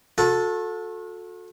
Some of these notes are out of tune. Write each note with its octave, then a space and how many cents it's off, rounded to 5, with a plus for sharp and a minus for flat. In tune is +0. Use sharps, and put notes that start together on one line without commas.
F#4 -40 A4 +0